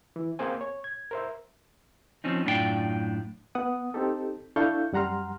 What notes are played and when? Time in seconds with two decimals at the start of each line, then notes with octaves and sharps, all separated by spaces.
0.16 E3
0.39 A#3 C4 G#4 C5 G#5
0.61 C#5
0.84 G#6
1.11 A#4 C5 E5
2.24 F3 C4 C#4 D#4
2.45 F#2 A2 D4 F4 G4 G5
3.55 B3 F#5 D#6
3.94 C4 D#4 G4 A4
4.56 D4 E4 A4 F5 C#6 G6
4.93 F#2 G3 F#5 A#5 C6 F6